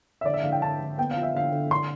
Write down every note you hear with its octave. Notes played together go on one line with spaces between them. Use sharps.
E5
D3 D5
E5
D3 F5
G5
D3 A5
D3
B3 G5
F5
F3
E5
D3 F5
D3
D3 C6